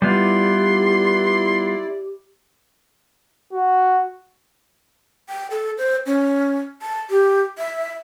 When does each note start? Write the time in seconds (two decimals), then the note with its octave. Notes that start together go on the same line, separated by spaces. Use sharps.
0.02 G3 B3 E4 F4 G4 D5 C6
3.53 F#4
5.29 G5
5.51 A4
5.78 C5
6.06 C#4
6.82 A5
7.10 G4
7.58 E5